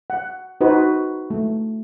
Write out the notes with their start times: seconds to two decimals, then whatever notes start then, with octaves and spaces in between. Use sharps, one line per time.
0.10 F#5
0.61 D#4 F#4 B4 C5
1.30 A3